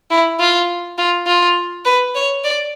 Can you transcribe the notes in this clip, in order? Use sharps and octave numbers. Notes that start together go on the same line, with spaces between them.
E4
F4
F4
F4
B4
C#5
D5